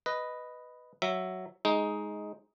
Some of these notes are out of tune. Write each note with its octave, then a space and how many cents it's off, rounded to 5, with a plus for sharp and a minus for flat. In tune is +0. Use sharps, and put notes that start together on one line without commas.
B4 +5 D#5 +0
F#3 +0 E5 +0
G#3 +10 D#4 +10